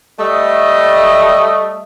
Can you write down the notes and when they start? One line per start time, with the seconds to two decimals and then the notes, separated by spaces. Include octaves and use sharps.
0.19 G3 A3 D#5